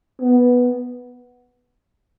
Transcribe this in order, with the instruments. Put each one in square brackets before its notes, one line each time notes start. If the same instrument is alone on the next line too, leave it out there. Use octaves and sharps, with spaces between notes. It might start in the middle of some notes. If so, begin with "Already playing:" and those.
[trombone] B3